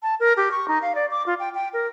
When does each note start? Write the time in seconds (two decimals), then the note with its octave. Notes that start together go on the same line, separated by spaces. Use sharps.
0.03 A5
0.20 A#4
0.37 G4
0.52 C#6
0.68 D#4
0.82 F5
0.95 D5
1.11 D6
1.26 F4
1.40 G5
1.55 G5
1.74 A#4